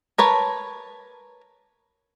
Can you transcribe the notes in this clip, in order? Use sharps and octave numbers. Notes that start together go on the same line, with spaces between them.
A#4 B4 C#5 A5